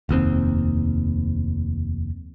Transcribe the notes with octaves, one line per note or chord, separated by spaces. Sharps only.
F1 D#2 G#2 C4